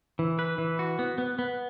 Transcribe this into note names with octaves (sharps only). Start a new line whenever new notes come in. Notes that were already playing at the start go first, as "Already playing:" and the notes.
E3
B4
E3
F#4
B3
B3
B3